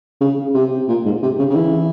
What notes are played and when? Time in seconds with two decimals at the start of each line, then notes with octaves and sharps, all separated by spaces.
0.21 C#3
0.54 C3
0.89 A#2
1.05 G#2
1.23 C3
1.39 C#3
1.50 C#3
1.56 E3